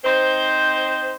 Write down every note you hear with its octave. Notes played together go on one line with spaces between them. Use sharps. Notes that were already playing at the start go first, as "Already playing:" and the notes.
C4 D#4 C5